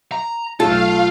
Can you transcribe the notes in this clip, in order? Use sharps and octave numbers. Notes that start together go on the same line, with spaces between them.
A#5
B1 A3 F4 A4 F5